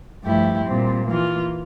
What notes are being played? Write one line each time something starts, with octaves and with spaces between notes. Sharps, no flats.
G2 F3 A3 E4 G4
A#2 G3 C4
E3 A#3 F4